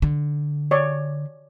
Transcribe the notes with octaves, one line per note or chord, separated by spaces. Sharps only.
D3
C#5 D5